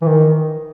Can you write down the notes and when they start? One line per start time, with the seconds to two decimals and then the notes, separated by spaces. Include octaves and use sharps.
0.02 E3
0.06 D#3